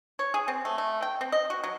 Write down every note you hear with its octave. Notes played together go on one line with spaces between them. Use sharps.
C#5
G#4
C4
A3
A3
G5
C4
D#5
F#4
F#3